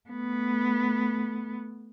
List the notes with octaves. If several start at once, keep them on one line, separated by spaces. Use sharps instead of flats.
A3 B3